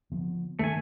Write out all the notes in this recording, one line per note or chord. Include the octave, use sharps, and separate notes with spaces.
D3 F3 B3
G2 D#3 A3 G#5